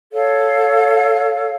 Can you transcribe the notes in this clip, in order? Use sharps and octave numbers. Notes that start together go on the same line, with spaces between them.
A4 C#5 F5